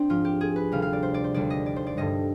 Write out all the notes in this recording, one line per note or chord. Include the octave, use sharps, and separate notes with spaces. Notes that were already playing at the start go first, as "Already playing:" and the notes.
Already playing: C4 D4
G#2 F3 F4
G4
G#4
B4
D2 C3 G3 F5
F5
D5
C5
D5
C5
D#2 D3 G3 D5
D#5
D5
C5
D5
G2 D3 G3 D#5